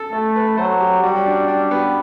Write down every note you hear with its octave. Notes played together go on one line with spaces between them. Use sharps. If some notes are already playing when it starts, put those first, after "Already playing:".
Already playing: A4
A3 A4
B4
F#3 C5
G4
G3 F#4
D4
D4
B3